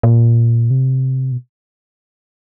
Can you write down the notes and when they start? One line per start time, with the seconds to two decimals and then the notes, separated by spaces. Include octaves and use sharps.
0.03 A#2
0.70 C3
1.32 B2